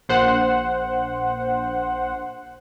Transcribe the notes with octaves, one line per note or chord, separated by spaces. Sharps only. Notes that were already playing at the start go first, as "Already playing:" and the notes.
A#1 C5 F#5